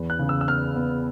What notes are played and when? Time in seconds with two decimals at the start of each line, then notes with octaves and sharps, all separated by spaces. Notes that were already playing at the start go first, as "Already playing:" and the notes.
Already playing: E2 B3
0.10 F#6
0.19 C#3
0.29 E6
0.41 E6
0.48 B3 F6
0.76 B3